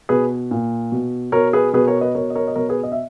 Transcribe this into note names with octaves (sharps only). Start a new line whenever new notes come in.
B2 G#4 B4
A#2
B2
B2 A#4 C#5
G#4 B4
B2 G#4 B4
A#4 C#5
B4 D#5
B2 A#4 C#5
D#5
A#4 C#5
D#5
B2 A#4 C#5
G#4 B4
D#5
E5